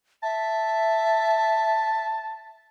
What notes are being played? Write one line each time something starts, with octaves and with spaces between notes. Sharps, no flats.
E5 A5